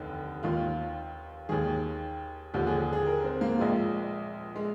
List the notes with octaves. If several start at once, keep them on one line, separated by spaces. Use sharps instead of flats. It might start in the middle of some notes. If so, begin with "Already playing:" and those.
Already playing: F1 D#2 D3 D#4
D#2 D#3 F4
D#2 D#3 G#4
D#2 D3 F3 G4
G#4
G#4
G#4
A#4
C4
A#3
A#1 A#2 F3 G#3
G#3